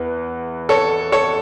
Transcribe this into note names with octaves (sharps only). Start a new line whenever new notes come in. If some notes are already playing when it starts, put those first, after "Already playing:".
Already playing: E2 B4
A4 C#5
A4 C#5